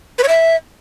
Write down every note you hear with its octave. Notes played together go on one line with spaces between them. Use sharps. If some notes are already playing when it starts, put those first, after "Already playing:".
B4
C#5
E5